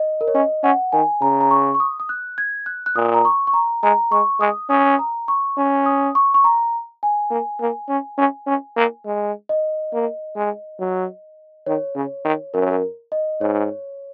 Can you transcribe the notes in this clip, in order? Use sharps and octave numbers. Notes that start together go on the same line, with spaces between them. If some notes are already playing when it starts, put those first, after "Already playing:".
Already playing: D#5
A#4
C#5
C#4 D#5
C#4 F#5
D#3 G#5
C#3 A#5
A#5
C#6
C#6
D#6
D#6
F#6
G#6
F#6
F#6
A#2 D#6
A#5
C#6
C#6
A#5
G#3 A#5
G#3 C#6
G#3 D#6
C#4 D#6
A#5
C#6
C#4
D#6
C#6
C#6
A#5
G#5
A#3
A#3
C#4
C#4
C#4
A#3
G#3
D#5
A#3
G#3
F#3
D#3 C#5
C#3
D#3
F#2 A#4
C#5
A#4
D#5
G#2 C#5